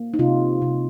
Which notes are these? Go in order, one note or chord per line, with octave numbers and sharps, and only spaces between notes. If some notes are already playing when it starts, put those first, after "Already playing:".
Already playing: A#3
D#4
C3 F4
C3